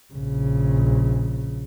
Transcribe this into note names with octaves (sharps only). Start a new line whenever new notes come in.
A#1 C#3